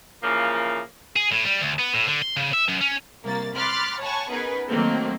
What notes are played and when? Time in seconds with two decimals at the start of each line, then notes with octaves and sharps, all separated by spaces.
0.22 A#2 C#3 E3 F3 A#3
1.16 G#4
1.32 A2
1.45 G3
1.61 D2
1.79 B3
1.94 A2
2.08 D3
2.22 C6
2.37 C#3
2.53 E5
2.68 F#2
2.81 C#4
3.24 C2 A#3 A6
3.56 B5 C6 D6 F6 F#6 A6
4.00 C#5 F#5 G#5 A5 B5 C#6
4.30 B3 C#4 D#4 G#4 A#4 B4
4.68 D#3 F#3 A3 A#3 C4